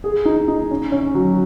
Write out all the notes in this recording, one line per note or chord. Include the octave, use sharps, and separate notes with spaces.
G#4
D#4
D#4
C#4
C#4
F#3